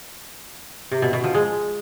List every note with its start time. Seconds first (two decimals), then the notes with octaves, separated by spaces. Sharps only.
0.92 C3
1.02 B2
1.13 B2
1.24 F3
1.34 G#3